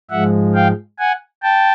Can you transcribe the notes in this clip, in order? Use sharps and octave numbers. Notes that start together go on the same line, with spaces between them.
G#2 F3 G#3 E5 F#5
F5 G5
F#5 G#5
G5 A5